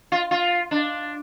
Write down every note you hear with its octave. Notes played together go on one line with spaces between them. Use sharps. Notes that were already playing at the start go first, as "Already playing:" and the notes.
F4
F4
D4